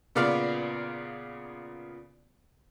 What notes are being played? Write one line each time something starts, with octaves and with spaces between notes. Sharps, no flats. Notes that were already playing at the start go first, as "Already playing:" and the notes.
A#2 C#3 B3 D5 F5